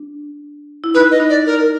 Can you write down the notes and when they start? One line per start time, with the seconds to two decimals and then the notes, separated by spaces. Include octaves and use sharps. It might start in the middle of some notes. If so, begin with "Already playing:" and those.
Already playing: D4
0.84 E4
0.94 D#4 B4
1.11 D#5
1.20 D#4
1.30 D5
1.46 A#4